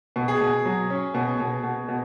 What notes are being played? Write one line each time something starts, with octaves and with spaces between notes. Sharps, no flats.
B2
G#4
B2
F#3
C#4
B2
B2
B2
B2